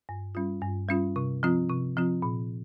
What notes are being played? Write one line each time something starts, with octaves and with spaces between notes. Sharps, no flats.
G2
G3 C#4 F4
G2
G3 C#4 F4
C3
F3 C4 F4
C3
F3 C4 F4
A#2